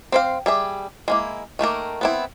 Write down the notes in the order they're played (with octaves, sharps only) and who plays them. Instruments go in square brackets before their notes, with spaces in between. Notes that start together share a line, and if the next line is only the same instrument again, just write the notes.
[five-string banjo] C4 C5 F5
G3 G#4 E5
G#3 A#3 E4
D#3 A3 A#3 A#4
B3 C4 E4